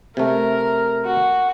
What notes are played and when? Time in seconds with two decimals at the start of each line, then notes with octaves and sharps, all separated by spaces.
0.17 C3 A3 A#4
1.05 F#4